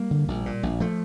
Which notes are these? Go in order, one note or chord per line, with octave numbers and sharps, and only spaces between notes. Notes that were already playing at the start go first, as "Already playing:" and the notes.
Already playing: G3 A#3
D3
A#1
A#2
A#1
F3 A3